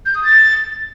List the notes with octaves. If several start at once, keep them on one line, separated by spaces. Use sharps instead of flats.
G6
D#6
A6